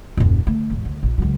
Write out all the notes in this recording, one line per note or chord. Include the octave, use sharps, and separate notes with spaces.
D#1 F#2
D3 A3
E1 A1
D2
A#1
C#2 F#3